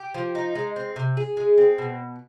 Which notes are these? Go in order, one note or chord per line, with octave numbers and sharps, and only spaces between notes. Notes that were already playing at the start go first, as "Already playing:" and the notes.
Already playing: G4
F3
D#4
G#3
C4
C3
G#4
G#3
C4
B2